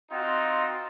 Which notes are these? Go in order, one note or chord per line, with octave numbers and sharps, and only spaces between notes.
C4 D#4 F4 F#4